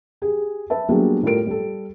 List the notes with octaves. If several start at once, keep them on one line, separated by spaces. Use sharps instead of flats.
G4 G#4
B4 E5 A5
F#3 G3 A#3 B3 D4 G#4
A2 G3 F4 A4 A#4 D7
G3 A4